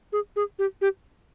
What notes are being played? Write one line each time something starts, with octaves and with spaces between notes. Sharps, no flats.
G#4
G#4
G4
G4